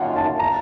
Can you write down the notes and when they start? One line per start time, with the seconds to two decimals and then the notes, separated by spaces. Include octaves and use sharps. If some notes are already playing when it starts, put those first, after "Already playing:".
Already playing: F#2 D#3 A#3 C#4 F4 F#5
0.16 A5
0.39 A#5